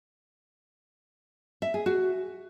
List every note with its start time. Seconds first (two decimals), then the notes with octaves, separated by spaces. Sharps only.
1.62 E5
1.74 G#4
1.86 F#4